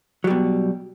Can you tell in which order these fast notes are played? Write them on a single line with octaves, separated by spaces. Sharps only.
F#3 G3 B2